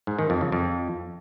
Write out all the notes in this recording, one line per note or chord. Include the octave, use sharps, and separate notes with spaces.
G#2
D#3
F2
C#3
F2